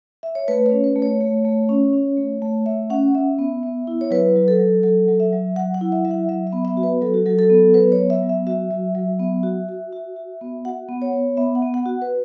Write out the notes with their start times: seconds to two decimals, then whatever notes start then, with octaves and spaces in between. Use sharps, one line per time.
0.23 E5
0.35 C#5
0.48 A3 B4
0.66 C#5
0.71 C#4
0.84 B4
0.96 A3
1.02 C#5
1.21 A3
1.45 A3
1.69 C#4
1.93 C#4
2.17 A3
2.42 A3
2.66 A3 E5
2.90 C#4 F#5
3.14 C#4 E5
3.39 B3
3.63 B3
3.87 E4
4.01 C#5
4.11 F#3 B4
4.36 F#3
4.48 A4
4.59 F#3
4.83 F#3 A4
5.08 F#3
5.20 E5
5.33 F#3
5.56 F#3 F#5
5.74 F#5
5.81 E4
5.92 E5
6.05 F#3 E5
6.11 F#5
6.28 F#3 E5
6.47 E5
6.53 B3
6.65 E5
6.77 F#4
6.83 B4
7.01 F#3 A4
7.14 F#4
7.26 F#3 A4
7.39 A4
7.50 B3
7.74 F#3 B4
7.92 C#5
7.99 B3
8.10 E5
8.23 F#3
8.29 E5
8.47 F#4 E5
8.71 F#3
8.95 F#3
9.20 B3
9.43 F#4
9.69 F#4
9.93 F#4
10.16 F#4
10.41 B3
10.65 F#4 F#5
10.89 B3
11.02 C#5
11.13 B3
11.37 B3 E5
11.55 F#5
11.62 B3
11.74 F#5
11.86 F#4
12.02 B4